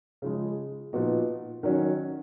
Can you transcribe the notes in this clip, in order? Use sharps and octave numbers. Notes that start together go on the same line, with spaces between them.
C#3 F3 G#3
A#2 F3 B3 D#4 F#4
D#3 F#3 C#4 F#4